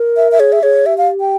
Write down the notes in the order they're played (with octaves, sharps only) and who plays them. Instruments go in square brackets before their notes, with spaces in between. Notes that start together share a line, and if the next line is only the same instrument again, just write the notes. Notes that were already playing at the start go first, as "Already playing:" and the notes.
Already playing: [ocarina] A#4
[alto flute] E5
E5
[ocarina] G#4 [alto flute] C#5
[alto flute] E5
[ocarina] G#4 [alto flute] C#5
[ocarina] G4 [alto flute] E5
[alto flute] F5
G5